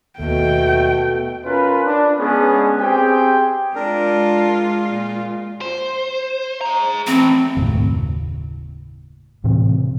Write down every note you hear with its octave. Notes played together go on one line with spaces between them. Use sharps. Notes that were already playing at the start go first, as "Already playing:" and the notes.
D#2 B2 A3 G5
C#4 F4 A#4 B4
D4
G#3 B3 C#4 D4 G#4
C4 G4 G#4 G5
G#3 D4 F4 A#4
A#2
C5
G#4 A#5
A2 E3 C4
F#1 D#2 A2
A2 C3 E3 C4